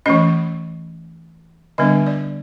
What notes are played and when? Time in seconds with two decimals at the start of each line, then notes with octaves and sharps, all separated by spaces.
0.06 E3 A3 C#4 D#5
1.78 D3 G3 B3 D4 D#5
2.06 D5